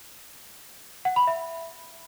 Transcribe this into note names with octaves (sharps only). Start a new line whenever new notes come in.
F#5
B5
E5